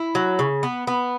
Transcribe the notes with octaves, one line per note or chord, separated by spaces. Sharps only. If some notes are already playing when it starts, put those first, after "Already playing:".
Already playing: E4
F#3
C#3
B3
B3